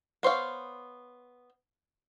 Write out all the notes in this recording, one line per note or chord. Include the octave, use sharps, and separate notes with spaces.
B3 C5 C#5 F5